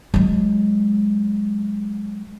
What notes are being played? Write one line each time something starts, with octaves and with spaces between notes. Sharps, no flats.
F#3 G#3